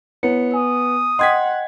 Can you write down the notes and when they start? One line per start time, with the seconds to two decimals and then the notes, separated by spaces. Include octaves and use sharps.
0.23 B3 E4 C#5 C#7
0.54 G#5 D#6
1.19 D#5 F#5 G5 C6 G#6 B6